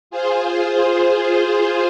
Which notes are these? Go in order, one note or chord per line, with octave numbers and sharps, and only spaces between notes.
F4 G#4 C5